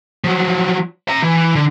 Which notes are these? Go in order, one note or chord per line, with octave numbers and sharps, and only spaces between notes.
F3 F#3
E5 A#5
E3
D3